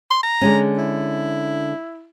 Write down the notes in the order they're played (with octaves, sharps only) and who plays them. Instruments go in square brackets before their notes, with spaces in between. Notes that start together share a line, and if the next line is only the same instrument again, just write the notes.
[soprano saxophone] C6
A#5
[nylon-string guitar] D3 G#3 C#4
[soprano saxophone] E4